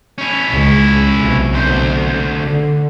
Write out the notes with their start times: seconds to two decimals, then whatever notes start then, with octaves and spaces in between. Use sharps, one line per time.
0.18 C#4 E4
0.51 C#2
1.17 B1 C3
1.53 D2 C5
2.44 D3